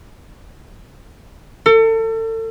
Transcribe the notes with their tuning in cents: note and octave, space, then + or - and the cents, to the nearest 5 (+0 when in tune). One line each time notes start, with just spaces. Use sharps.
A4 +35